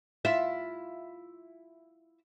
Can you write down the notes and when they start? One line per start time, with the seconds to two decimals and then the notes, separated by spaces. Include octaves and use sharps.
0.25 E4 F4 E5